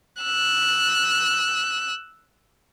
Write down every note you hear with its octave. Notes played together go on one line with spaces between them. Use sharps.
E6 F#6